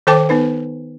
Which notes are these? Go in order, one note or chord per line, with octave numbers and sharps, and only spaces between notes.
D#3 A4 C5 G5 A5 D6
B3 D#4 B4